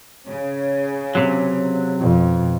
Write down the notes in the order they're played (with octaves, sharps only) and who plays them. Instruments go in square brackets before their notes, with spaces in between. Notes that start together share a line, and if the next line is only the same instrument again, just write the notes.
[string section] C#3
[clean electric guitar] C3 F#3
[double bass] F2 B2